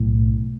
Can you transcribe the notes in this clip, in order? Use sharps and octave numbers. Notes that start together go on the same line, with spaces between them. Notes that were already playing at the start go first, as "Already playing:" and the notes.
Already playing: B1 A2